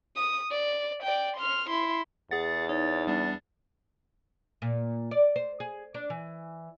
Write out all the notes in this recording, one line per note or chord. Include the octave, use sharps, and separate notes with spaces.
D#6
D5
D5 G5
C6 F6
E4 C6
E2 G#4 F#5 A6
D#4 C#5
G3 B3 D4
A#2
D5
C5
G#4
D4
E3